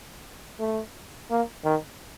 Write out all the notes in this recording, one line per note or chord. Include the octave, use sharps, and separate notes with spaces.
A3
A#3
D#3